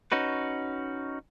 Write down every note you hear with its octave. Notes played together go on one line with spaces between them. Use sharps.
C#4 D#4 F#4 B4